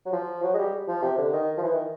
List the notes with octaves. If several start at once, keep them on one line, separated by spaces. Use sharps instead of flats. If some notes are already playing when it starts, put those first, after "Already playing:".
F#3
F3
F#3
G#3
G3
F3
C3
D3
D#3
F3
E3
D#3